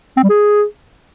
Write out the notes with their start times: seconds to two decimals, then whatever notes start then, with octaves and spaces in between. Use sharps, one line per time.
0.17 C4
0.23 G3
0.29 G#4